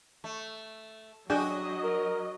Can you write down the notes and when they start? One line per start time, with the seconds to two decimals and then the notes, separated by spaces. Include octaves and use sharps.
0.24 A3
1.30 F#3 D4 F#4 G#4 D#5 G5
1.84 A#4